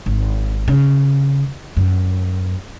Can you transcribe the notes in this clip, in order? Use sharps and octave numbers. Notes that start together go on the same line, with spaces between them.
G#1
C#3
F#2